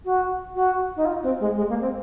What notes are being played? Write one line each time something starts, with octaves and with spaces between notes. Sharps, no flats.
F#4
F#4
D#4
F4
C4
G#3
G#3
A#3
C4